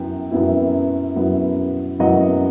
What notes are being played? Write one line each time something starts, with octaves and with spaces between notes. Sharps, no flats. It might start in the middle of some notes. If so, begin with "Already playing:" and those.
Already playing: F#2 F#3 B3 E4 G5
F#2 F#3 B3 E4
F#2 F#3 B3 E4
F#2 F#3 B3 E4 D#5 F#5